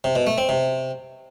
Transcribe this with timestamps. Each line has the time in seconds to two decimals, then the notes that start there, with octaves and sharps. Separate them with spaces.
0.04 C3
0.16 B2
0.27 A3
0.38 C4
0.49 C3